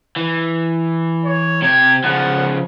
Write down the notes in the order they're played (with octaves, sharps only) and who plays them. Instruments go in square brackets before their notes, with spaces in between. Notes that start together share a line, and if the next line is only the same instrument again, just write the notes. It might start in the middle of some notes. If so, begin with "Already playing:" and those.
[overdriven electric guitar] E3
[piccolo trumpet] C#5
[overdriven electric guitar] C3 G4 [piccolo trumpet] G#6
[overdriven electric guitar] C#3 F3 [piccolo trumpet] F#5